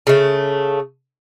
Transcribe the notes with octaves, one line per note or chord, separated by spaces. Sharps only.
C#3 A3